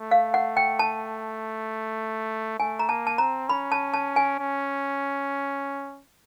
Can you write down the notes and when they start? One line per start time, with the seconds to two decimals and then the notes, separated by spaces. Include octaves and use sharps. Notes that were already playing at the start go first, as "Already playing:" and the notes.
Already playing: A3
0.11 F5
0.34 F#5
0.57 G5
0.79 A5
2.59 A3 G#5
2.79 A#5
2.89 A#3 A5
3.07 A5
3.18 C4 A#5
3.48 C#4 B5
3.72 A5
3.94 A5
4.16 G#5
4.39 C#4